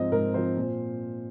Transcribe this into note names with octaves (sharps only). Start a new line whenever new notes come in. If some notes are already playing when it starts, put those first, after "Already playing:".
Already playing: G#2 F3 C4 D#5
G#2 A#4
F3 C4 C5
A#2